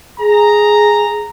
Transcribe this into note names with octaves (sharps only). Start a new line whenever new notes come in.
G#4 A#5